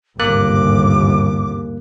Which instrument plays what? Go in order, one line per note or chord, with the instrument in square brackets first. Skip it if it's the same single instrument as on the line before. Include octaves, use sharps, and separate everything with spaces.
[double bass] G1 [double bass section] D#2 G#2 C3 [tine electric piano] A#3 F#6 [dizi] D6